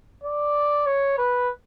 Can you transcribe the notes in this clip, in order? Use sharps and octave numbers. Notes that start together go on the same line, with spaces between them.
D5
C#5
B4